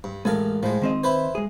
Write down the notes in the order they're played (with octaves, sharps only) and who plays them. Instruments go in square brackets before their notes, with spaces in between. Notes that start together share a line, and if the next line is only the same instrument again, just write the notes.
[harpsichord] G2
[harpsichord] A1 A4 F5 [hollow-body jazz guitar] G#3 A#4
[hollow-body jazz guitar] A2 [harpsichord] F3 G#3
[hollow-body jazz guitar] D#3 C4 D#5
[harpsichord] E4 B4 C5
[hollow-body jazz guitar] G#3 G#4